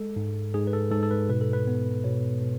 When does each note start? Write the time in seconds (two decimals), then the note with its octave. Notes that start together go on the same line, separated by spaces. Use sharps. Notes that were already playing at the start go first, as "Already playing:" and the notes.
Already playing: G#3 A4
0.16 G#2
0.54 G#2 G#4
0.67 B4
0.73 A4
0.91 G#2 A4
1.03 A4
1.11 B4
1.29 B2 B4
1.41 A4
1.53 B4
1.67 B3
2.04 B2 C#5
2.42 B2